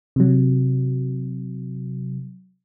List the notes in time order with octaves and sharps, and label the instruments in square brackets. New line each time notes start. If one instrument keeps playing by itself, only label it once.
[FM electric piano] C3 F#3